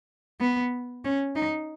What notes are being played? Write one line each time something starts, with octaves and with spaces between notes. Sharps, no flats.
B3
C#4
D#4